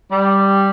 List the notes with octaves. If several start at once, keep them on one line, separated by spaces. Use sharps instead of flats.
G3